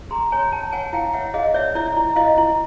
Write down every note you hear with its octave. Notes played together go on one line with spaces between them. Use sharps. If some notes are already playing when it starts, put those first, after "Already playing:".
G#4 A#5 C6
C#5 G#5 A#5
C#5 G5 A5
C#5 F#5 G#5
E4 F5 G5
C#5 E5 F#5
G#4 D#5 F5
C#5 D5 E5
E4 D5 E5
E4
E4 D#5 F5
E4